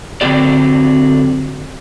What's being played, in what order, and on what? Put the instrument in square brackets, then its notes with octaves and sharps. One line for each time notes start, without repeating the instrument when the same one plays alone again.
[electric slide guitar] D3 F#3 C4 D4 G4 D5